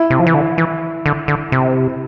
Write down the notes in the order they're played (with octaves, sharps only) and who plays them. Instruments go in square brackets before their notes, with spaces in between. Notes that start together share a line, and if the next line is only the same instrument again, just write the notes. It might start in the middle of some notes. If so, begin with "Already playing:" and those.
Already playing: [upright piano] E4
[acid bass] C3
F3
E3
D3
E3
D3
D3
C3